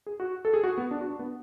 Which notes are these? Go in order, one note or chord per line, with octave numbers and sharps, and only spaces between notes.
G#4
F#4
A4
G#4
F#4
B3
D4
F#4
D4
B3